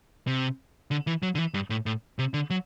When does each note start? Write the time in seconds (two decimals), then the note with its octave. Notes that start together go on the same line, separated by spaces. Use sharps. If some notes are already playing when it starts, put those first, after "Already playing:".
0.27 C3
0.91 D3
1.07 E3
1.23 F#3
1.35 D3
1.38 E3
1.54 G2
1.70 A2
1.86 A2
2.19 C3
2.34 D3
2.50 F#3